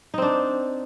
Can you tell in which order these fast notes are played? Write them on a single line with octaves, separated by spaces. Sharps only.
D#4 C4 D4